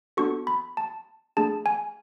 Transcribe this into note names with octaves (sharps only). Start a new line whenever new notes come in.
B3 D4 F#4 A4 C#6
B5
A5
A3 D4 G#4 A5
G#5